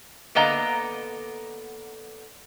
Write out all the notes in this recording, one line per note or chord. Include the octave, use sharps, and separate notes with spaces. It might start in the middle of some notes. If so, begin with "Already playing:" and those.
D3 A#3 B3 D#5 A#5